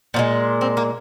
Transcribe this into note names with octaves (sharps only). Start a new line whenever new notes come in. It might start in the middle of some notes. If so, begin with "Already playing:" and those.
A#2 F3 G#3
C4
A#3